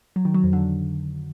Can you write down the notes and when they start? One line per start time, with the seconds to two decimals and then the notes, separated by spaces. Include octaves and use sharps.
0.16 F#3
0.25 D#3
0.34 F#3
0.44 F2
0.53 D3